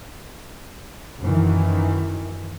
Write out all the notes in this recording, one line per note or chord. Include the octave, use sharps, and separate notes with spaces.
F#2 D#3 E3